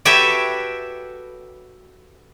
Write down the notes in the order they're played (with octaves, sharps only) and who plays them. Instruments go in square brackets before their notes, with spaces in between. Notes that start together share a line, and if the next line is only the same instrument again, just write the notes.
[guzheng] F#4 G4 A4 B4 C#5 E5